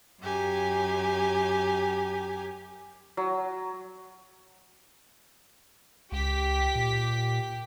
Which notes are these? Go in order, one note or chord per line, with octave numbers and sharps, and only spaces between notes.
F#2 G4 A#4 G#5
F#3
C#2 G4 B6
A#2